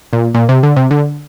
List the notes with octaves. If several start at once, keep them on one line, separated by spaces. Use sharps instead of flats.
A#2
A#2
C3
D3
C3
D3